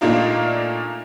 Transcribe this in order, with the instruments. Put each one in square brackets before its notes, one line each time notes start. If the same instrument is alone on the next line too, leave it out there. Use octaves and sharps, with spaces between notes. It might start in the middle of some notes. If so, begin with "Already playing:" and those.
[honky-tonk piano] A#2 A3 A#3 D4 D#4 F4